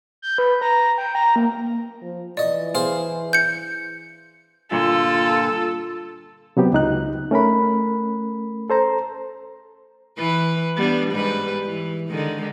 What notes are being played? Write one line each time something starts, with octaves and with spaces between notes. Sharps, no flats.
G6
B4
A#5
G5
A#5
A#3
F3
E3 D5 D#5 C#6
G#4 C5 F5
G6 C#7
G2 A#2 D3 F4 A4
C3 F#3 B3 G4
C#2 D#4 F#6
A3 C#4 A#4 B5
A4 C5 A#5
E3 B4
G3 B3 D4
G#2 G3 B4
E3
D3 D#3 G#3